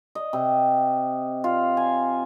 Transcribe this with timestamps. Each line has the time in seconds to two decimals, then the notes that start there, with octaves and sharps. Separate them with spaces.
0.15 D#5
0.33 C3
1.44 F4
1.77 G#5